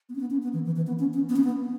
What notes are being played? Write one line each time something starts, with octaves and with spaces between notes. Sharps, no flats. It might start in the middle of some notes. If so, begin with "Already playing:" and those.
B3
C#4
B3
C#4
B3
E3
E3
E3
B3
C#4
C#4
B3
C#4
B3